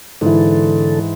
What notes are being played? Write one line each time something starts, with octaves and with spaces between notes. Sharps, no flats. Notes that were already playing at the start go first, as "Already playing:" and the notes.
G#2 D3 E3 A4